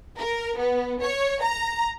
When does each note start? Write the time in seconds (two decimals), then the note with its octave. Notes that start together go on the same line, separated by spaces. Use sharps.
0.17 A#4
0.58 B3
1.02 C#5
1.42 A#5